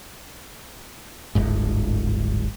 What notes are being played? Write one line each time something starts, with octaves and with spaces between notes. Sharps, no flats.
D1 G1 G#2